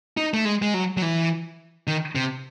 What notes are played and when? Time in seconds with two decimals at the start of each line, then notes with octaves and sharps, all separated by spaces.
0.17 D#4
0.34 A3
0.45 G#3
0.62 G#3
0.74 F#3
0.97 F#3
1.02 E3
1.87 D#3
2.15 C3